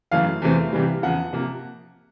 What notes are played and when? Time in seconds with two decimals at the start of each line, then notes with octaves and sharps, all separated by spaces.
0.11 F#2 C#3 E3 A3 F5
0.42 E2 C3 E3 A3 C4
0.73 C3 E3 G3
1.02 E2 C#3 F3 F#5
1.33 C3 F3 A#3